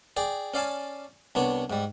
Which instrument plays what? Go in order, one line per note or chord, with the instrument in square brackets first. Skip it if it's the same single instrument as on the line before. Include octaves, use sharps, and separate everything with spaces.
[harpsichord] G#4 D5 G5
C#4 D5 F5 G#5 A5
C2 B3 D4 C#5
G#2 G3